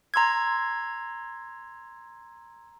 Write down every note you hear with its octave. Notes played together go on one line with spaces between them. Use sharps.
A#5 C6 E6 G#6